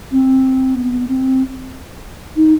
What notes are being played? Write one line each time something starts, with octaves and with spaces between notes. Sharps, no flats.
C4
B3
C4
D#4